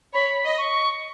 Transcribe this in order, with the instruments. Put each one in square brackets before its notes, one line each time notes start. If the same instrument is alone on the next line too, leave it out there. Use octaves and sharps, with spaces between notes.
[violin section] C#5 [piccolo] B5
[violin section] D#5
[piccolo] C#6